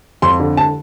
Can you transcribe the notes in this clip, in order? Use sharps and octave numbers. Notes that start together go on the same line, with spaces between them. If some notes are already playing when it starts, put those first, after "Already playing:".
F2 C6
D3
A5